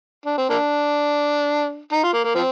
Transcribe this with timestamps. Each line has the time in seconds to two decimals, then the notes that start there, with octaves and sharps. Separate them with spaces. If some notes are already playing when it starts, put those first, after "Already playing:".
0.26 D4
0.37 C4
0.50 A#3 D4
1.92 D#4
2.04 F4
2.13 A#3
2.24 A#3
2.35 F3 C4